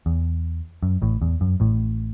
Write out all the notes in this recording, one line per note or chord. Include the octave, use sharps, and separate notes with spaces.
E2
F#2
A1 A2
E2
F#2
A1 A2